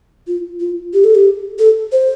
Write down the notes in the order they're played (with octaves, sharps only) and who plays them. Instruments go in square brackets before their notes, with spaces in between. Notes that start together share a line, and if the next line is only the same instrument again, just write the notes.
[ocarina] F4
F4
G4
A4
G4
A4
C5